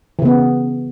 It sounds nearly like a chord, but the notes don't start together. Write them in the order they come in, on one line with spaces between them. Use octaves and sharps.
E3 C#3 B3